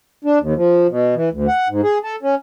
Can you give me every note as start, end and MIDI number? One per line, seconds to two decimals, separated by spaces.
0.24 0.39 62
0.41 0.54 39
0.56 0.87 53
0.90 1.15 47
1.15 1.29 52
1.32 1.47 38
1.48 1.68 78
1.69 1.81 44
1.83 1.98 68
2.03 2.16 69
2.22 2.35 61